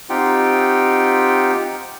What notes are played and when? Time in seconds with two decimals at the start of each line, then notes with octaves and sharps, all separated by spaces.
0.09 C4 D#4 F4 G4 F#5 G5